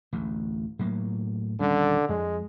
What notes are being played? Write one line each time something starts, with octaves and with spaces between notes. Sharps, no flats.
A1 D2
A2 F#3 A#3
D#1 D3 G3 C#4
F2 G#3